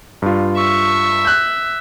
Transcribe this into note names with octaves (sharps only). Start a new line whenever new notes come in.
G2 F4
E5 C#6
F#6 G6